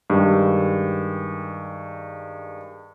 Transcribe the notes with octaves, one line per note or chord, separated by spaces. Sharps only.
G2 D#3 G#3 G4